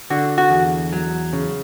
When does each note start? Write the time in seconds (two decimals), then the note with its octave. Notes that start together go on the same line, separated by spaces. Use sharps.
0.10 D3 F#4
0.38 F#4
0.51 E2
0.93 F#3
1.33 C#3